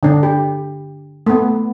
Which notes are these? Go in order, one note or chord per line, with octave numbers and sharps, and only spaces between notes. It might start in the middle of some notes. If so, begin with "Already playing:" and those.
D3 D4
G4
A3 B3